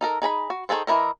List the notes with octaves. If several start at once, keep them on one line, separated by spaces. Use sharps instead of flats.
D#4 A4 A#4
D#4 G#4 A#5 B5
F#4
D#3 D#4 G#4 A4 C5
E3 F#3 E4 A#4 D#5